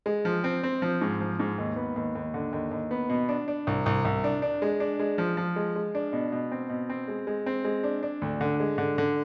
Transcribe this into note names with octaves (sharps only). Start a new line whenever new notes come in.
G#3
F3
C4
C4
F3
G#2
F3
G#2
D#2
B3
D#2
D#2
D3
D#2
D#2
B3
B2
D4
D4
C2
C2
C2
D4
D4
G#3
D4
G#3
F3
F3
G#3
G#3
D4
B2
B2
C4
B2
C4
G#3
G#3
C4
G#3
D4
D4
D2
D3
G#3
D3
D3